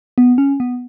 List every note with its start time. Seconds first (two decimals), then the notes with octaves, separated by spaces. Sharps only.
0.18 B3
0.38 C#4
0.60 B3